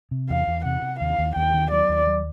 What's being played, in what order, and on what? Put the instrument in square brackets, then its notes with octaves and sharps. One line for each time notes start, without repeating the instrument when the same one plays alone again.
[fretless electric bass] C3
[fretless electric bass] E2 [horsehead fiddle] F5
[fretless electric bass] E2
[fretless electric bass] C3 [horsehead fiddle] F#5
[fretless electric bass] C3
[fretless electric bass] D#2 [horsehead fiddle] F5
[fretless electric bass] D#2
[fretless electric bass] D#2 [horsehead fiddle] G5
[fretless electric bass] D#3
[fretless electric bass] F#3 [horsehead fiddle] D5
[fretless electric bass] D#2
F#3